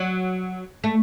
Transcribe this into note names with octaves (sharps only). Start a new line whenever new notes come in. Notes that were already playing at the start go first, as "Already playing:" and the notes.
Already playing: F#3
A3